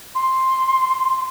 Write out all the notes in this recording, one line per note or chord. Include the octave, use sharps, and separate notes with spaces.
C6